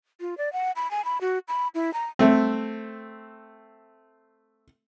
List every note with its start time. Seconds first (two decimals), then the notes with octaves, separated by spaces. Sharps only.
0.21 F4
0.38 D5
0.53 F#5
0.76 B5
0.91 G#5
1.05 B5
1.21 F#4
1.48 B5
1.75 E4
1.94 A#5
2.19 A3 C4